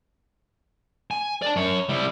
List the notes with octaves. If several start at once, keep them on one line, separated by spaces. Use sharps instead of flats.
G#5
D5 A5
F#2 C#5
G3 E4